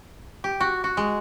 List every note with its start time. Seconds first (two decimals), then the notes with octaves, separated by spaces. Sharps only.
0.44 G4
0.60 F#4
0.84 F#4
0.97 G#3